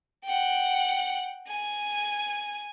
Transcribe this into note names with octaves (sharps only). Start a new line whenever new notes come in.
F#5 G5
G#5